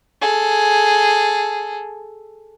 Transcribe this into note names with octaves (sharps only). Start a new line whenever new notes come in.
G#4 A4